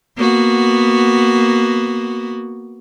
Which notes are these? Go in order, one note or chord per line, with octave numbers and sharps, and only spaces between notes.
A#3 B3 F#4